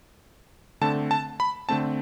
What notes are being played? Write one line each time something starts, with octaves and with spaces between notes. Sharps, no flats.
D3 A3 C4 A5
A5
B5
D3 A3 C4 A5